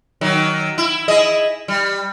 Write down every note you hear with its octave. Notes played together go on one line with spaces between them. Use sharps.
D#3 F#3
E4
E4 G#4 D#5
G3